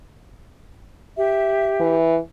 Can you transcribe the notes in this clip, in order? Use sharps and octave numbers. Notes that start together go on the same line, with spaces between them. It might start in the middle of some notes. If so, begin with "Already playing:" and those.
G4 E5
E3